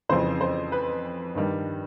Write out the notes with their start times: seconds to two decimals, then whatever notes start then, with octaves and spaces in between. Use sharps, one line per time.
0.09 F2 C#3 E3 C5
0.41 C5
0.72 B4
1.35 G2 D#3 G3